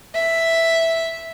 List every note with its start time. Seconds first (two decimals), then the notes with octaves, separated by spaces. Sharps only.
0.15 E5